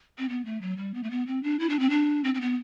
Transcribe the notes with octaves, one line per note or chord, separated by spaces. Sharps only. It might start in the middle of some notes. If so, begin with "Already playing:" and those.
C4
B3
A3
F#3
G3
B3
A3
B3
C4
D4
E4
D4
C4
D4
C4
C4
B3